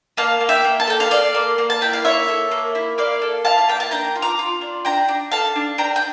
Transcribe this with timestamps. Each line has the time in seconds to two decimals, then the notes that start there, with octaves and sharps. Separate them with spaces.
0.17 A#3 F5 A5
0.41 A#3
0.49 E5 G5
0.64 A#3
0.80 A5
0.87 A4 G5
1.00 F5 A5
1.11 A4 D5 F5
1.34 A#3
1.58 A#3
1.70 A5
1.81 E4 G5
1.93 F5
2.05 A#3 C#5 E5
2.29 A4
2.52 A#3
2.75 E4
2.98 A#3 D5 F5
3.22 A4
3.45 E4 F5 A5
3.58 F5
3.69 A#3 G5
3.80 A5
3.91 D4 G5 A#5
4.16 F4
4.22 A#5 D6
4.39 F4
4.61 D4
4.85 D4 G5 A#5
5.08 D4
5.32 A4 F5 A5
5.56 D4
5.78 D4 G5 A#5
5.96 G5